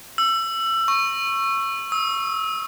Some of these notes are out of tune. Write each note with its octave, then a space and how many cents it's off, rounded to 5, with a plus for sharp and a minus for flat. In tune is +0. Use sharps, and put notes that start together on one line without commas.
E6 +25
C#6 -10
E6 -35